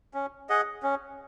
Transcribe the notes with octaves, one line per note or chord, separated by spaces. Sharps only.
C#4
G#4 D#5 F#5
C#4